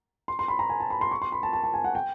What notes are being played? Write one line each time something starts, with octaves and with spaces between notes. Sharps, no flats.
C6
C6
B5
A#5
G#5
A5
B5
C6
C#6
C6
B5
A5
A5
A5
G#5
F#5
G5